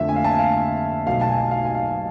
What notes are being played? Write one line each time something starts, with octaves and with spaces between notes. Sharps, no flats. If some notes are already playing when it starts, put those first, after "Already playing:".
Already playing: F2 D3 A3 E5
G#5
F5
A5
G#5
F5
B1 B2 A3 F5
A5
G#5
F5
G#5
F5